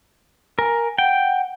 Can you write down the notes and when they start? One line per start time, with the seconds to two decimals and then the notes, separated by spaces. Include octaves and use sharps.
0.59 A#4 G#5
0.98 F#5 G5